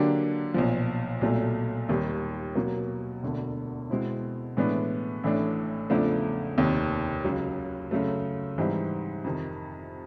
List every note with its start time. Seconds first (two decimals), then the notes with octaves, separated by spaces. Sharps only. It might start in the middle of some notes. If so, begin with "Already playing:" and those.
Already playing: D3 F#3 A#3 D4 G4
0.54 B1 A#2 F3
1.21 B1 A#2 F#3 A3
1.89 D#2 D#3 G3
2.55 B2 F#3 A#3
3.23 E1 D2 D3
3.90 B2 G#3 C4 E4
4.57 A2 E3 G#3 B3 D4
5.24 A1 A2 E3 A3 D4
5.90 E2 C#3 F3 A3 D4
6.58 F1 D#2 D#3
7.25 C#2 C#3 F#3
7.91 F#2 C#3 F#3 A3
8.58 G#2 E3 G3 C4 D#4
9.24 F2 C3 D#3